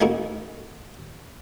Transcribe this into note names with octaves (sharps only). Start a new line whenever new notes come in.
A3 A#3 C#4 D#4 E4 F#4